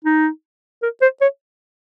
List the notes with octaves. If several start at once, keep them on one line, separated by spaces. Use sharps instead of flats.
D#4
A#4
C5
C#5